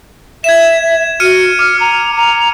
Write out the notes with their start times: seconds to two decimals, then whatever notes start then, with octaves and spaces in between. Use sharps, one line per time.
0.44 E5 G#6 E7
1.20 F#4 F6 C#7 D#7
1.59 D6 F6
1.80 A#5
2.16 A#5